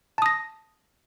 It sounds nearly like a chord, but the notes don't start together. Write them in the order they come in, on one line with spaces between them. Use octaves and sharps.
A5 D#6 A#6